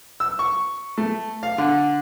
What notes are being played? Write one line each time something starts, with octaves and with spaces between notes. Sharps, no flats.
E6
C#6
A3
F5
D3